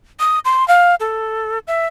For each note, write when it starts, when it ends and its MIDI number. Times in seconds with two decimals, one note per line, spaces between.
0.20 0.39 87
0.45 0.67 84
0.68 0.95 77
1.00 1.59 69
1.67 1.87 76